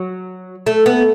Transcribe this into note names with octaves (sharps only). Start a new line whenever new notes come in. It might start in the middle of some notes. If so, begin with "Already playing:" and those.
Already playing: F#3
A3
B3